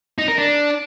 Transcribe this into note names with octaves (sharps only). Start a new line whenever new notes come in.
D#4
A#4
D4